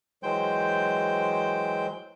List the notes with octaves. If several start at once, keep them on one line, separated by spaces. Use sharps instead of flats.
E3 F#3 G#3 C5 G5 G6